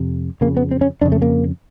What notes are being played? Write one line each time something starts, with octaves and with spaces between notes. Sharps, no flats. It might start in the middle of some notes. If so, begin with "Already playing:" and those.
Already playing: F2 C3
F2 C#3 A#3
B3
C4
C#4
F2 C#3 D4
A3
A#3